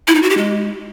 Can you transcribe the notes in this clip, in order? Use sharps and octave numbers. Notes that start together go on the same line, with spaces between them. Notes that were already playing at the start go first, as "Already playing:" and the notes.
E4
D#4
F#4
G4
G#3